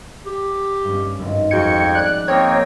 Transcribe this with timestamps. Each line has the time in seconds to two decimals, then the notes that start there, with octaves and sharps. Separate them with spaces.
0.25 G4
0.84 G2 C#4
1.19 G#1 G2
1.51 F2 F3 F#4 G#4 G5 G#6 C#7 D#7
1.95 D5 F#6
2.28 A#3 C4 D#4 C#5 G5